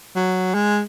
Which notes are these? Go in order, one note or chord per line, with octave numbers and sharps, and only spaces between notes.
F#3
G#3